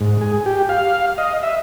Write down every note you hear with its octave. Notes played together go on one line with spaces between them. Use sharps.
G#2
G#4
G4
F5
D#5
E5